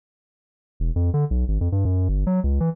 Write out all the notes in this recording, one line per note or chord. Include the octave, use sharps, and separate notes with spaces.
E1
F2
D3
B1
G#1
F2
G2
F#2
G1
F#3
C#2
E3